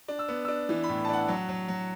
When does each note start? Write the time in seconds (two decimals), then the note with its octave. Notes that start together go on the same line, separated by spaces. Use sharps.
0.08 D4
0.19 E6
0.28 B3
0.45 D4 E6
0.69 E3
0.83 B5
0.89 A2
1.05 A5
1.09 D4 F#5
1.28 F#3
1.49 F#3
1.68 F#3